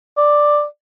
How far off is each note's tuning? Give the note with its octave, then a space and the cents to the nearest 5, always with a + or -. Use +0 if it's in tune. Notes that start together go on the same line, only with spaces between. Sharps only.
D5 +5